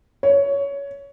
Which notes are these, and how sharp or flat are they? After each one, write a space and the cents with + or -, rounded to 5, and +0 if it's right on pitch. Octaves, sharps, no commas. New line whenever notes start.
C#5 +15